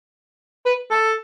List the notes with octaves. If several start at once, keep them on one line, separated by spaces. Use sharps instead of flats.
B4
A4